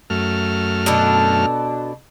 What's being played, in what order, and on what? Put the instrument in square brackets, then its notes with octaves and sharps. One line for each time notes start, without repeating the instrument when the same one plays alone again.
[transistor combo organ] F#2 A3 F6
[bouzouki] B2 D4 A4